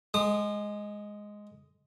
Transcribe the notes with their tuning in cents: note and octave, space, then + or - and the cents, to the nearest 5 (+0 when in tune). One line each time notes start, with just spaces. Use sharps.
G#3 +0 D#6 -35